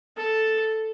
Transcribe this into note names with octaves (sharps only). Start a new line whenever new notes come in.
A4